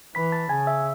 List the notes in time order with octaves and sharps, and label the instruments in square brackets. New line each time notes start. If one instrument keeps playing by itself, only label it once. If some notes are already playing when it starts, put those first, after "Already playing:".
[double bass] E3 [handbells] B5 B6
[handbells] A5 A6
[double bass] C#3 [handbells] G#5 G#6
[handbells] E5 E6